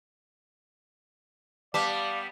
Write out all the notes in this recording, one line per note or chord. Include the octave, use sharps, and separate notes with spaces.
G3 B3 D5 F5 A5 D6 B6